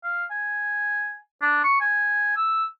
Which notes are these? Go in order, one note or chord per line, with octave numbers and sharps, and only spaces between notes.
F5
G#5
D4
C#6
G#5
E6